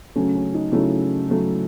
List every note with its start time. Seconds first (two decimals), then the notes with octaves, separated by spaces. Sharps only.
0.16 C#3 F#3 A3 C#4
0.35 C#4
0.54 D#4
0.72 C#3 F#3 A3 E4
1.28 C#3 F#3 A3